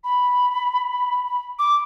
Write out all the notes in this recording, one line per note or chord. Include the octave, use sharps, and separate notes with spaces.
B5
D6